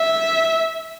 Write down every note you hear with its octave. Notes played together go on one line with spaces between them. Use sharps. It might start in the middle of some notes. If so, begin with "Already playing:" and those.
Already playing: E5